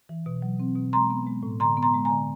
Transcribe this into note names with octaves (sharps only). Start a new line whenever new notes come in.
E3
B2
F#3
C4
B2
G#3 A#5 C6
B3
G#3
A2
D3 A#5 C6
B3
A#5 C6
G#3
G#5 A#5
D3